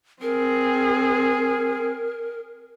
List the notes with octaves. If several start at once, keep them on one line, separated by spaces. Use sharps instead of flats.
C4 G#4 A#4